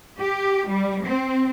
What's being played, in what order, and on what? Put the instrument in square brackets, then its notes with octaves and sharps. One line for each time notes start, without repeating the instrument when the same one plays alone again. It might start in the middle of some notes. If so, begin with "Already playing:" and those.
[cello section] G4
G3
C4